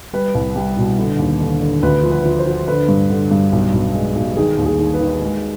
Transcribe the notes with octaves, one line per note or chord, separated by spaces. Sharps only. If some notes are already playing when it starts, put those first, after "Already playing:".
G3 B4
C2
G3
B2
D3
D#2
D3
D3
D2 B4
F3
B4
F3
C5
F3
D3 B4
G2
D3
G2
B1
B1
G#3
B1
D#3 G#4
D#2
G#4
D#3
B4
D#3
G#3